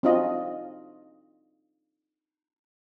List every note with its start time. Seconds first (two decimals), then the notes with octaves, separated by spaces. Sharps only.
0.03 C4 D4 D#4 F4 F#4 D#5